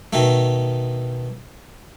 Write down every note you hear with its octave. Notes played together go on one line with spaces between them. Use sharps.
B2 D#3 A3